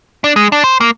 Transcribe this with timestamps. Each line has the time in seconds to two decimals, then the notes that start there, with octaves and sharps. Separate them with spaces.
0.24 D4
0.36 G#3
0.52 D4
0.64 C5
0.81 A#3